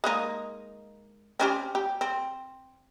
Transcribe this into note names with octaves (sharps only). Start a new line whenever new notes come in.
G#3 A#3 D#4
C4 C#4 G4
G4
C4